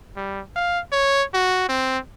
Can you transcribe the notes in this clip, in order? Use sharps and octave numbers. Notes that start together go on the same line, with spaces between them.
G3
F5
C#5
F#4
C4